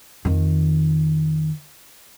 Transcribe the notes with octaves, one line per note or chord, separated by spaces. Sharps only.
F2 D#3